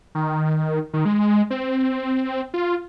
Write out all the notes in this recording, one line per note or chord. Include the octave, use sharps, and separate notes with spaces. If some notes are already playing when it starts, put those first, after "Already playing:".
D#3
D#3
G#3
C4
F4